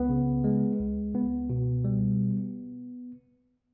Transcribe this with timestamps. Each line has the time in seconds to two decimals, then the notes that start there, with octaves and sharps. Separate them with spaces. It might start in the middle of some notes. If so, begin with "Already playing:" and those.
Already playing: C#2 B3
0.09 C#3
0.44 G#3
0.79 C#2
1.14 C#2 B3
1.50 B2
1.84 G3